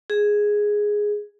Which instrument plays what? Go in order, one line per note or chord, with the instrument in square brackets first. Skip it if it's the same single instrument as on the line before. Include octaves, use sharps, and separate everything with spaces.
[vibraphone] G#4